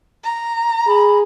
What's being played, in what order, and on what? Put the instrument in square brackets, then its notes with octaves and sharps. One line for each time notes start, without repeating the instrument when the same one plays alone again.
[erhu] A#5
[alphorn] G#4 [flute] B5